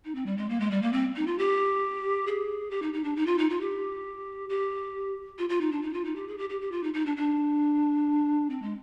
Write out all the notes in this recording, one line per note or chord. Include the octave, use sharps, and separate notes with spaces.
D#4
C4
G3
G#3
A#3
G#3
G3
A#3
C4
D#4
F4
G4
G#4
G4
D#4
D#4
D4
D#4
F4
D#4
F4
G4
G4
F4
F4
D#4
D4
D#4
F4
D#4
G4
G#4
G4
G4
G4
F4
D#4
D#4
D4
D4
C4
G#3